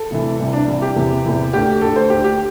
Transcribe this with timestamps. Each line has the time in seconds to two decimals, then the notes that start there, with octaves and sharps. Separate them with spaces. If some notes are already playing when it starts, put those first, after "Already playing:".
Already playing: A4
0.10 D2 C3 E3
0.39 C2 C3 E3
0.53 D4
0.67 C2 C3 E3
0.82 G4
0.96 E2 C3 E3
1.24 E2 C3 E3
1.53 D2 D3 G4
1.81 D2 D3 A4
1.96 C5
2.10 D2 D3 G4
2.24 G4